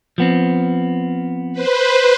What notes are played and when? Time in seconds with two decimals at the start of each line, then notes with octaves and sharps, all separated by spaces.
0.18 F3 B3 C4
1.53 B4 C5